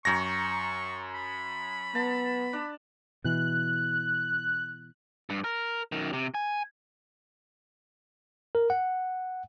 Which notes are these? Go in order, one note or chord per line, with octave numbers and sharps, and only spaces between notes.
F#2 C#5 G5 A#5 C#6 A#6
B5
B3 A5
D4
B2 E3 F#6
G2
A#4
F#2 D#3
C3
G#5
A#4
F#5